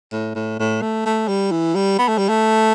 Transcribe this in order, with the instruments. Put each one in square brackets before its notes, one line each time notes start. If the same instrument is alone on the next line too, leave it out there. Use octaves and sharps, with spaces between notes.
[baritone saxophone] A2
A2
A2
A3
A3
G3
E3
G3
B3
A3
G3
A3